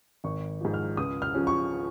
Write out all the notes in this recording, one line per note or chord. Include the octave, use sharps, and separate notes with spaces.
G#1 C#6
G#2 F3
F6
C#2 D#6
F6
C#3 F3 C#4
C#6